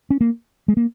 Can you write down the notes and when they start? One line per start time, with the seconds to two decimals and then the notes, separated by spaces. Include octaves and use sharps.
0.10 C#4
0.21 A#3
0.68 G#3
0.77 A#3